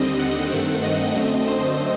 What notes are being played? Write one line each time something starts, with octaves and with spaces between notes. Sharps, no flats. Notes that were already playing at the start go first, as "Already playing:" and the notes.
Already playing: D#2 D3 G3 C4 D#5
F#5
G2 D#3 A3 C4
D#5
F#2 D3 A3 C4
C5